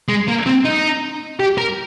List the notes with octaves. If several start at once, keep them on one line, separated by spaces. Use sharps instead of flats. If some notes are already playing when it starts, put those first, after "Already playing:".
G#3
A#3
C4
D#4
G4
A#4